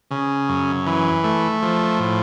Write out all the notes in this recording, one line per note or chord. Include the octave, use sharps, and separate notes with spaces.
C#3
F#2
E3
A3
F3
A2